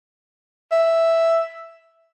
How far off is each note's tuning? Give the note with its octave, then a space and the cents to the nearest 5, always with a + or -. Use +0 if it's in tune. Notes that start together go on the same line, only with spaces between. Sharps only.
E5 +0